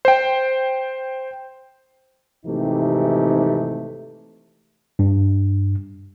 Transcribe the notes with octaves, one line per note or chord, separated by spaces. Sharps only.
C5 G5
G#1 C3 E3 A3 D#4 G4
G2